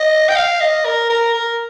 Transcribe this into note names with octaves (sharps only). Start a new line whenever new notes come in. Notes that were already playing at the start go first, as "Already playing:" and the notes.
Already playing: D#5
G5
F5
D#5
A#4
A#4
A#4